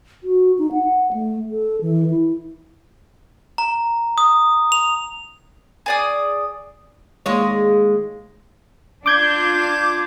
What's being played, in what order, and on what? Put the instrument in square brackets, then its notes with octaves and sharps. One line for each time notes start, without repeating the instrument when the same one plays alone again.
[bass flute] F#4
D#4
F#5
A3
A4
E3
E4
[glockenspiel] A#5
D#6
F7
[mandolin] G#4 D5 D#6
[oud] D#2 G#3 C#5
[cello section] D4 F4 [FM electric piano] D6 G6 G#6